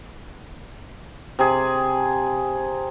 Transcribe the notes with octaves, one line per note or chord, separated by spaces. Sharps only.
C3 G#4